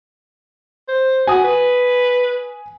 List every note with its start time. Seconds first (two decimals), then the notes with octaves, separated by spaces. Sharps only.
0.89 C5
1.27 F#4 G#5 D#6
1.44 B4